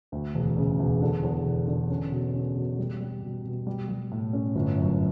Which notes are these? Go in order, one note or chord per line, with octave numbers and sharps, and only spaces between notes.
D2
E1
C#3
E1
D3
E2
E1
D3
C#4
B2
C#4
B2
G3
G3
B2
B2
G3
G3
A2
C#4
G1
F#2